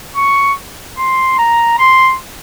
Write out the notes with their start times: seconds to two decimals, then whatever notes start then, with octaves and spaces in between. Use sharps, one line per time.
0.16 C#6
0.98 C6
1.38 A#5
1.79 C6